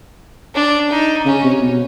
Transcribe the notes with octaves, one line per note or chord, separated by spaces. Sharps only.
D4
D#4
C#3 C#4
C3
B2